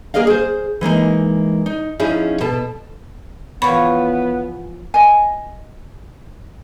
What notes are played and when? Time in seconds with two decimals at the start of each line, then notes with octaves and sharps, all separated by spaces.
0.14 A#3 G#4 A#4 D#5 F5
0.27 G#4 C5
0.81 E3 G#3 A#3 D#4
1.66 D#4
1.99 F3 C#4 D#4 E4 G#4
2.41 B2 A4 A5
3.62 E3 F3 B3 C#5 B5
4.94 D#5 G#5